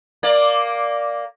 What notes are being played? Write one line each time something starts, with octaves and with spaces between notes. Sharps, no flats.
A#3 D5